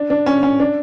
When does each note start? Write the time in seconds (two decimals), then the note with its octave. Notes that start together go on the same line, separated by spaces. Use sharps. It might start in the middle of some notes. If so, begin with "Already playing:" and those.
Already playing: D4
0.10 D4
0.26 C#4
0.43 C#4
0.60 D4